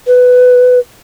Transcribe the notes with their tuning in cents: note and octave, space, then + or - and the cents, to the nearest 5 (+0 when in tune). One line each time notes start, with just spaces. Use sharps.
B4 +10